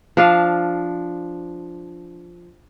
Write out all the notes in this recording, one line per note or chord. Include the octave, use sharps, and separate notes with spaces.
F3 D4 F5